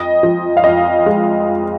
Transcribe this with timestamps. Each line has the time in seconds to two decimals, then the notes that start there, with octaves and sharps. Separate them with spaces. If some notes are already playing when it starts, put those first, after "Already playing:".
Already playing: F2 D#5
0.23 F3
0.57 F5
0.64 F2 D#5
1.06 G#3